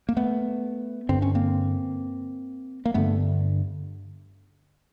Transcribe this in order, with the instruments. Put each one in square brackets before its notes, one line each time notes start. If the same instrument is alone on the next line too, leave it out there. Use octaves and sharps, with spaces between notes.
[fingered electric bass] A#3
A3 B3
G2 D3 C4
C#4
A#3 C4
A#3
G2 D3 A3 B3